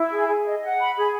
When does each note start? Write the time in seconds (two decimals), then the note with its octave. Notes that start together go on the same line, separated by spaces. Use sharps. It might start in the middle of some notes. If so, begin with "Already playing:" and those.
Already playing: E4
0.10 G#4
0.28 G#4
0.45 D#5
0.63 F#5
0.80 B5
0.97 G#4